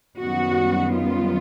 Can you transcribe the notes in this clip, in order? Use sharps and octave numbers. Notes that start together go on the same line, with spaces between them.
F#2 D#3 G3 B3 F#4
F4